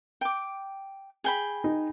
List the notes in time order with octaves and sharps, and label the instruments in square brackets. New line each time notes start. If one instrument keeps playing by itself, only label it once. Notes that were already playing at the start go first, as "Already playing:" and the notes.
[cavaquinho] G5 D6
G#4 G5 B5
[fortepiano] D#4